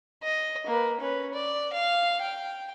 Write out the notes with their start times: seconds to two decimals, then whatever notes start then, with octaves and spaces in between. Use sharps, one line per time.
0.23 D#5
0.67 A#3 B4
1.00 C#4 B4
1.34 D5
1.73 F5
2.21 G5